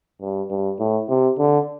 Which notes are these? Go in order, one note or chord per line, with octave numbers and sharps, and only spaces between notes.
G2
G2
A2
C3
D3